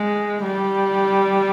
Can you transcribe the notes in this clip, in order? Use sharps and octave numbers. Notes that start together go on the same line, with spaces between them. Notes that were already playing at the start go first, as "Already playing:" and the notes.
Already playing: G#3
G3